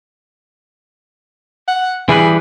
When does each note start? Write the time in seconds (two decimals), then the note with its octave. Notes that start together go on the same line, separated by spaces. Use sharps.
1.68 F#5
2.09 E3 G3 G#4 B4